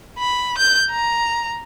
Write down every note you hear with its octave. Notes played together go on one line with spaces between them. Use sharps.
B5
G6
A#5